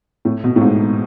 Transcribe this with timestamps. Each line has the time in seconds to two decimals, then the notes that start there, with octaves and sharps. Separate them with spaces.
0.25 A2
0.44 B2
0.56 A2
0.61 G#2